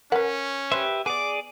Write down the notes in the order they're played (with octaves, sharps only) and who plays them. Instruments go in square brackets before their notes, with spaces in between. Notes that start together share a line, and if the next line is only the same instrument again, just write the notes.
[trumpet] C#4 [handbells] A#4 [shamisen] B4 F#5
[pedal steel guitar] G4 B4 E5 [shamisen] C5
[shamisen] B3 [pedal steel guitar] G#4 D5 [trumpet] D6